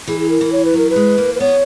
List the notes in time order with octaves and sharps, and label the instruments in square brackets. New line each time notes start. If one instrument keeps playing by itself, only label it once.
[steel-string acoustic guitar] E3 [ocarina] G#4
[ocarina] G#4
A#4
[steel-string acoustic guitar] E3
[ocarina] C#5
B4
[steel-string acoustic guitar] F#3 [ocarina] A#4
[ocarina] B4
[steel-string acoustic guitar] G#3
A#3
[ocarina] B4
[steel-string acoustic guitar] B3 [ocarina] C#5